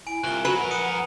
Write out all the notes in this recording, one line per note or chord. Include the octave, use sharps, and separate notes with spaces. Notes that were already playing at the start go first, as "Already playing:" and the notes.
E4 G#5 D7
C2 F4 F#6 G7
F#3 F#4 B4
F2 A#4 F#5
D#6 C#7 D#7